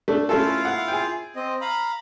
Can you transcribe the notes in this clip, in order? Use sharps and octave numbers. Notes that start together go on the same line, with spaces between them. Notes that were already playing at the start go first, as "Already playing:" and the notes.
A3 D4
A3 C#4 E4 F4 A4 F5
F#5
G#4 G5
C4 D#5
F5 A#5 B5